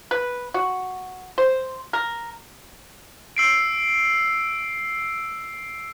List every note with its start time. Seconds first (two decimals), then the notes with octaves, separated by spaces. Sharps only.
0.11 B4
0.54 F#4
1.38 C5
1.93 A#4
3.37 E6 C7 D7